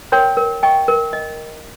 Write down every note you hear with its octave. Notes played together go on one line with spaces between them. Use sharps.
A#4 C#5 G5 C6
A#4
D#5 G5 C#6
A#4
D#5